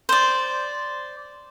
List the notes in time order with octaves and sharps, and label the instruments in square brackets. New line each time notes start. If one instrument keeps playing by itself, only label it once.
[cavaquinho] C5 D5